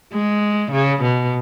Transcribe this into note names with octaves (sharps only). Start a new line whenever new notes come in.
G#3
C#3
B2